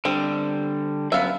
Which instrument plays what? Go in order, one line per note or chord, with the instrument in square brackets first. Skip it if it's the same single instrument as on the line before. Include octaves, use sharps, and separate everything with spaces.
[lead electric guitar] D3 G3 [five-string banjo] C4
[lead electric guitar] F#2 B3 [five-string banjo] E5 F5